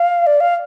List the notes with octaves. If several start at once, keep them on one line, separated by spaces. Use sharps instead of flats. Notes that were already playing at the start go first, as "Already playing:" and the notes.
Already playing: F5
D5
F5